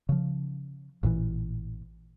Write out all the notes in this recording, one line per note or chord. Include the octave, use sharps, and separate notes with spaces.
C#3 F3
A1 A#2 D3 E3